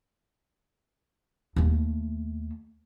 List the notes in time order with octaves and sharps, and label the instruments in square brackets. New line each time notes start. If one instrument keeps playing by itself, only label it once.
[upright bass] D#2 A3